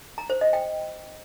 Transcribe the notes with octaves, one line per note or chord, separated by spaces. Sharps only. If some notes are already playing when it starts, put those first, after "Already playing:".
A#5
C5
D#5
G5